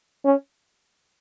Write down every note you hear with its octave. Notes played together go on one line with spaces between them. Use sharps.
C#4